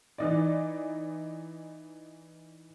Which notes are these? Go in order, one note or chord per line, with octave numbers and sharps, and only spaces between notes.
E3 D#4 D5